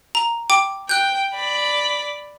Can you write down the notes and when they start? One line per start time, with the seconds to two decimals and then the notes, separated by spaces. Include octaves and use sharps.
0.15 A#5
0.50 G5 D6
0.89 G5 F#6 G6
1.34 D5 B5